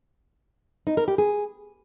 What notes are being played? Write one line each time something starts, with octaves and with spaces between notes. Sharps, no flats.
D#4
A#4
G4
G#4